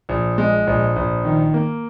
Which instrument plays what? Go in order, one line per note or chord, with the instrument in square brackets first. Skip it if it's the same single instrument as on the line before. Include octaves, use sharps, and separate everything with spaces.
[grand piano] A#1
G#3
A#1
A#1
D#3
A#3